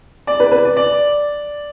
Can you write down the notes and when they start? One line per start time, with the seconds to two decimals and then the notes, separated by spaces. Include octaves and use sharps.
0.27 D5
0.40 B4
0.52 B4
0.65 D5
0.77 D5